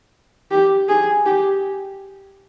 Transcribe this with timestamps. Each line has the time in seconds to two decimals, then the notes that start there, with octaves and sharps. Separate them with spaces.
0.51 G4
0.89 G#4
1.26 G4